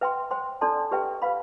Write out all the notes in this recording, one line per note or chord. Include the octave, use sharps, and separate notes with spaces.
B4 E5 G5 C6
C5 G5 C6
D4 A4 D5 A5 C6
G4 B4 E5 G5
B4 F5 B5